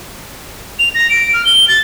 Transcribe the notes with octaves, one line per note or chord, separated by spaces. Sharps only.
F7
A#6
D7
F6
G7
A6